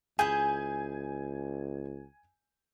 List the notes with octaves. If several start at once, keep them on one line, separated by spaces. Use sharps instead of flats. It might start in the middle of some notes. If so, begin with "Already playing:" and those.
C#2 E4 G#4 G#5 G6